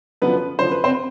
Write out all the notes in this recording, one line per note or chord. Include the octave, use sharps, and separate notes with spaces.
F#2 D3 F3 B3 B4
F#2 D3 F3 C5
B4
C4 C5